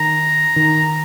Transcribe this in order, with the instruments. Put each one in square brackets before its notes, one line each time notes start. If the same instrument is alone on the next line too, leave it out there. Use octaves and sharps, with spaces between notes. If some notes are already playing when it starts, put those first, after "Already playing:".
Already playing: [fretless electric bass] D#3 [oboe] A#5
[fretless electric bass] D#3